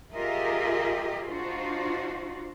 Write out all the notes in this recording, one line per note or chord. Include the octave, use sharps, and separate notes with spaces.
F4 G4 G#4 A#4 D#5 E5
D4 D#4 F4 F#4 C5